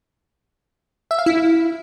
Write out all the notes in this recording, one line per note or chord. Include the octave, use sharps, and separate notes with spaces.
E5
F5
E4